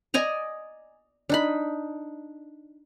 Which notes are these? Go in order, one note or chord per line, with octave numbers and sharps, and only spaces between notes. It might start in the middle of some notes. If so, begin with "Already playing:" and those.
D5 D#5 G#5 A#5
D4 D#4 B5